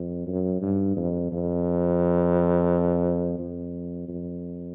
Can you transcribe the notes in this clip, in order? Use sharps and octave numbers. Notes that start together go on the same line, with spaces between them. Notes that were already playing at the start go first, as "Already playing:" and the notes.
Already playing: F2
F#2
G2
F2
F2
F2
F2